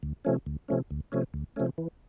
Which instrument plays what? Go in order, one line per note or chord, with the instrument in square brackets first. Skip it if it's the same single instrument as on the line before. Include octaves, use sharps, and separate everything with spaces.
[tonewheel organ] D2
C3 F3 A3 C#4
D2
C3 F3 A3 C#4
D2
C3 F3 A3 C#4
D2
C3 F3 A3 C#4
E3